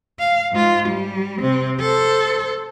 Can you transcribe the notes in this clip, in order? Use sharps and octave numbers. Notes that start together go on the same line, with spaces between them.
F5
G#2 F4
G3
C3 C4
A4 C5